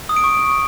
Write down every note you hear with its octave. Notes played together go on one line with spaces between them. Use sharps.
D#6
D7
C#6